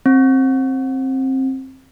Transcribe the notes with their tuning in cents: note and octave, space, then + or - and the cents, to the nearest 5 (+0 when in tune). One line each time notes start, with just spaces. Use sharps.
C4 +20